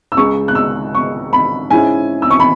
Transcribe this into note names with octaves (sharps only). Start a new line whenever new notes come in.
E6
C#2 C#3 G#3 C#6
F#6
E6
C#6
B5
G#2 G#3 C#4 E4 G#5
E6
C#6
B5